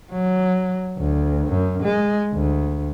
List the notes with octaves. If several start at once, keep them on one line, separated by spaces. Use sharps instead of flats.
F#3
D2
F#2
G#3
D2